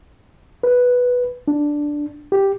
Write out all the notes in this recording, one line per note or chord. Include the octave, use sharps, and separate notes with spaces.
B4
D4
G4